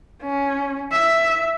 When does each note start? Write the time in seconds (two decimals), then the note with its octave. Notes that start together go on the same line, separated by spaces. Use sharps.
0.22 C#4
0.91 E5